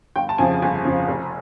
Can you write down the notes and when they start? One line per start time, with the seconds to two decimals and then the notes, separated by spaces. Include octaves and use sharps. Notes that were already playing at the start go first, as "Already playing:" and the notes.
0.16 G1 G5
0.29 A5
0.38 F2 C#3 F3 G#5
0.62 G1 G#5
0.85 F2 C#3 F3
1.08 F1